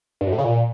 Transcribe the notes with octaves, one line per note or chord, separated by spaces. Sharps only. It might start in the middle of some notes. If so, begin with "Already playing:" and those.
G2
F#2
A2
C#3
A#2